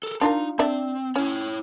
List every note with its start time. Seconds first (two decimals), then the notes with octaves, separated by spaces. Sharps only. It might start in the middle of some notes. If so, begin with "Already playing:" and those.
0.03 A4 A#4
0.21 D4 D#4 F4 A#4
0.59 C4 D4 D5 E5
1.16 C#4 E4 C#5